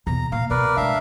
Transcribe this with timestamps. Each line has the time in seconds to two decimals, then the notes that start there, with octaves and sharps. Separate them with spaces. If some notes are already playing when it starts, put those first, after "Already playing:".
0.07 E2 B2 A#5
0.32 A#2 F5
0.50 B2 A#4 B4 D5
0.77 E3 G#3 D4 E5 F5